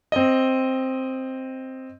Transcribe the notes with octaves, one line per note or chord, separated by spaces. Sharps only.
C4 D#5